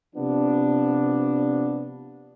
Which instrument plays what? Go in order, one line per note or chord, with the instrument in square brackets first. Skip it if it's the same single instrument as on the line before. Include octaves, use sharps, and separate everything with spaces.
[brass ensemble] C3 F3 B3 D4